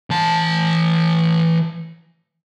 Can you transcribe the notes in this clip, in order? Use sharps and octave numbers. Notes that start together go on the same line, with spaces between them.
E3 A5